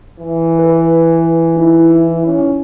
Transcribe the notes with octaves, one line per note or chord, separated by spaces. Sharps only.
E3
B4
D#4 E4
C#4